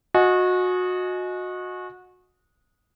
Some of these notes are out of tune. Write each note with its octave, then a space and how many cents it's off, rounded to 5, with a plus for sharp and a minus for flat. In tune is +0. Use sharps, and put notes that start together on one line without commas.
F#4 -25 D#5 +0 G#5 +25